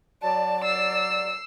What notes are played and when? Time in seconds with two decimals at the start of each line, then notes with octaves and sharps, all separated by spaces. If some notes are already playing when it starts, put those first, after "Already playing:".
0.23 F#3 D5 A5
0.64 E6 C7